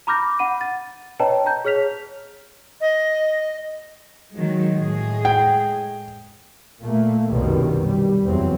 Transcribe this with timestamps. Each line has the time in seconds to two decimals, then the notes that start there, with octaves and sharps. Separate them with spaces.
0.07 A#5 B5 D6 F6 G6 A#6
0.39 F#5 B5 D#7
0.61 A6
1.19 B4 C#5 D#5 G5 A5 A#5
1.46 A#5 G6
1.65 G#4 C#5 F6 B6 F7
2.81 D#5
4.34 D#3 F#3 G#3
4.77 A2 G#3 G#4
5.25 G5
6.83 A#2 A3 A#3
7.30 C2 F#2 B2 D#3 G3
7.82 G3
8.26 F#1 E2 F#3 C4